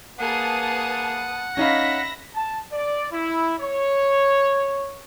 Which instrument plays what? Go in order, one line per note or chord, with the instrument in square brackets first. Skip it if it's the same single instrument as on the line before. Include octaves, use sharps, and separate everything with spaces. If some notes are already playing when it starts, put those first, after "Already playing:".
[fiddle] A#3 G#4 [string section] B4 A5 D#6 [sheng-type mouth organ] F#5
[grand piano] C#4 D#4 F5 [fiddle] E5 B5 [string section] A#6
[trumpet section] A5
D5
E4
C#5